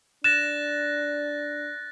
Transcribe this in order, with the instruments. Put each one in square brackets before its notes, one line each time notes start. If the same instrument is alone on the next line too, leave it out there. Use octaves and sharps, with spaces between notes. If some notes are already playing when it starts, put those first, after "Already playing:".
[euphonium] D4 [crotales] F#6 A6 A#6 [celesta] E7